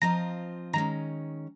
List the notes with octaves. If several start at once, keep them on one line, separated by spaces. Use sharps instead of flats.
F3 C4 F4 C5 D#5 A#5
D#3 G#3 C#4 A#5